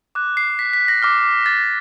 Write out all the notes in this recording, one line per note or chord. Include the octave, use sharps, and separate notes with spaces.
D6 F#6
C7
B6
B6
A#6
D6 F6
A6